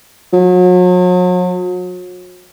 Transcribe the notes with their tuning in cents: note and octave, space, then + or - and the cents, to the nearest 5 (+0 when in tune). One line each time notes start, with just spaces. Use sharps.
F#3 -40